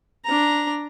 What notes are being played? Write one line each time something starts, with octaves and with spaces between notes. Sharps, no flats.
D4 A#5